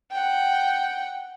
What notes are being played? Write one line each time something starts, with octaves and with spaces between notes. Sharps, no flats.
F#5 G5